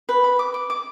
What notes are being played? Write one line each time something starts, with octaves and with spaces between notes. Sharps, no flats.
B4
B5
D6
D6
D6